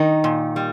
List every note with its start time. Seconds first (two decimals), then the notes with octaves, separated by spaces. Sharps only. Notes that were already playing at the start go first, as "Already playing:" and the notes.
Already playing: D#3 D#4
0.24 A#2
0.56 G3